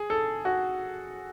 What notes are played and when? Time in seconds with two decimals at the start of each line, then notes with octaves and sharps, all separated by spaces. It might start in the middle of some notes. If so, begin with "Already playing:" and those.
Already playing: G#4
0.10 A4
0.45 F#4